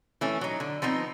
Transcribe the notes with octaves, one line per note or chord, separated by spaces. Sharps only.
E3 A3 C#4
F#3 D#4
D3
F3 B3 C4 D#4